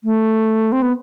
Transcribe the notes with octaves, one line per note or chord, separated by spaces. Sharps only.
A3
C4
B3